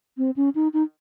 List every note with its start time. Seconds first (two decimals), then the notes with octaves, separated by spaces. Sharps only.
0.18 C4
0.36 C#4
0.55 D#4
0.74 D#4